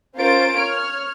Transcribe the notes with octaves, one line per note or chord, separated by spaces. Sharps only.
C#4 F4 A#4 C5 A6 D7
C#5 F6